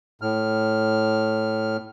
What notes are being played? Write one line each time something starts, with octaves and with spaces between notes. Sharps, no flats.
A2 F6